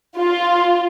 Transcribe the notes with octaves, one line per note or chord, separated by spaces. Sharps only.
F4